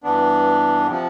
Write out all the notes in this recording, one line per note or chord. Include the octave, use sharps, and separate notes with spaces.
G2 E3 B3 D4
C3 F3